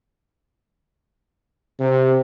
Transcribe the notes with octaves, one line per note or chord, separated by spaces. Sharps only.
C3